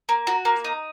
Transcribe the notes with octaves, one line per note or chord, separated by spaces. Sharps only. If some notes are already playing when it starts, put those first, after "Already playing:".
A#3
F#4
A#3
D#4